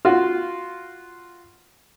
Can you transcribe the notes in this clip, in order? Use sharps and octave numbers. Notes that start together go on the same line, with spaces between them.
F4 F#4